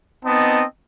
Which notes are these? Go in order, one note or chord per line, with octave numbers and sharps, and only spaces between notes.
B3 C4 D#4 D#5 A5